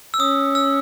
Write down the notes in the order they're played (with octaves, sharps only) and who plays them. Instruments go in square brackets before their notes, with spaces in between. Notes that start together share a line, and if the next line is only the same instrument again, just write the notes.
[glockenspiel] E6
[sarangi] C#4 [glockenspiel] D#6
[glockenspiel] E6